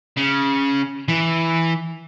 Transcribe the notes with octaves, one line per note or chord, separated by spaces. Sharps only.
C#3
E3